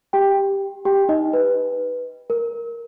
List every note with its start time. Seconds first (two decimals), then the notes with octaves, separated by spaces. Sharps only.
0.13 G4 G5
0.85 G4 G5
1.09 D#4 D#5
1.33 B4
2.30 A#4